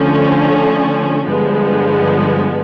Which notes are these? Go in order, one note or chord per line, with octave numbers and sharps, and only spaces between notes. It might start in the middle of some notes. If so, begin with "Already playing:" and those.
Already playing: D3 F3 A3 C#4
G2 D3 F3 G#3 B3